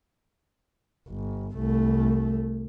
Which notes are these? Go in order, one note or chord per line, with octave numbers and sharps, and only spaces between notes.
G1
C2 A3